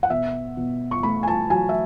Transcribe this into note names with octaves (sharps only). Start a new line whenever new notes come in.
F#5
B2 E5
B2
C#6
A3 B5
G#5
A5
F#3 G#5
E5